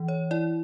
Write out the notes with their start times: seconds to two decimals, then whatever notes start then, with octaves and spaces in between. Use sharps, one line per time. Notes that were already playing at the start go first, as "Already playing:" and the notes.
Already playing: E3
0.08 C#5
0.31 E4 D5